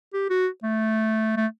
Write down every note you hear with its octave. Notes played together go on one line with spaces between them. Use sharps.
G4
F#4
A3
A3